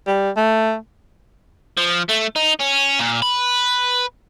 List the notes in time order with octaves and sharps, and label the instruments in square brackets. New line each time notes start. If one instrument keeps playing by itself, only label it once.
[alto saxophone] G3
A3
[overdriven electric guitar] F3
A3
D#4
C#4
A#2
B4